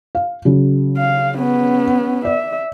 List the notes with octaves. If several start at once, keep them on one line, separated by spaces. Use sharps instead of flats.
F5
C#3 F#3
F5
B3 C#4
D5 E5